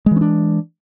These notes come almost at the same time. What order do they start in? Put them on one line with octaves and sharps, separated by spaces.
G#3 E3 C#4 D4